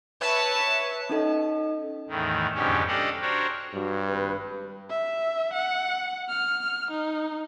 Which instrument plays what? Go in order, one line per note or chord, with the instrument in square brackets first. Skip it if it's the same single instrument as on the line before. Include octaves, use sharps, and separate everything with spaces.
[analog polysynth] B4 C#5 E5 [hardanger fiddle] A5
[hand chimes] C#4 D#4 A4 D#5
[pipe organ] E2 A2 D#3
F2 G#2 B2 D3 C#4 G4
D4 G4 A4 D#5 F5 F#5
D4 F#4 A#4 C5 C#5
[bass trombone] G2 [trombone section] F#3
[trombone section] G#1 G4 B4
[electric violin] E5
F#5
F6
D#4